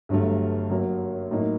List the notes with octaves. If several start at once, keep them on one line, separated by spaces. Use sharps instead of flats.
G1 G2 F#3 A3
F#2 F#3 A#3 F#4
A2 F#3 A#3 D#4